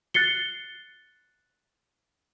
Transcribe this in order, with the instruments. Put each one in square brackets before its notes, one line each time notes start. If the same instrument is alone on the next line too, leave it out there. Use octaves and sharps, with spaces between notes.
[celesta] F#6 A6 C7 C#7 G7